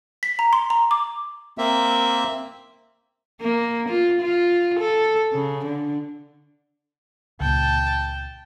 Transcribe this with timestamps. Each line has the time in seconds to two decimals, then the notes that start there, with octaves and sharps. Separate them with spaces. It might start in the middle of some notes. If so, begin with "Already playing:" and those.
0.23 B6
0.39 A#5
0.53 C6
0.70 A#5
0.91 D6
1.58 A#3 C4 E5
3.41 A#3
3.89 F4
4.22 F4
4.79 A4
5.33 C#3
5.65 D3
7.40 C#2 A#2 G5 A5